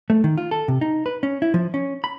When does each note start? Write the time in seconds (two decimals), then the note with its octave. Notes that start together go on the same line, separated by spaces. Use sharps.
0.10 A3
0.24 D#3
0.38 F4
0.51 A4
0.68 C3
0.81 D#4
1.06 B4
1.23 C#4
1.42 E4
1.54 F3
1.74 C#4
2.04 B5